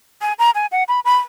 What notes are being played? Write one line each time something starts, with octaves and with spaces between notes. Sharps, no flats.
G#5
A#5
G#5
F#5
B5
B5